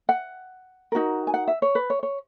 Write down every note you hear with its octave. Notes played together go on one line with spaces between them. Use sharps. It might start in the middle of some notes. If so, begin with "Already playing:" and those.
F#5
D#4 F#4 A#4
G#5
F#5
E5
C#5
B4
C#5
C#5